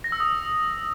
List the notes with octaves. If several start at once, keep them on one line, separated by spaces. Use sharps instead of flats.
A#6
E6
D#6